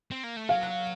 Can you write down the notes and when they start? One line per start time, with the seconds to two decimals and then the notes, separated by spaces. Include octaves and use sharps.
0.11 C4
0.24 A#3
0.36 A3
0.49 F#3 F5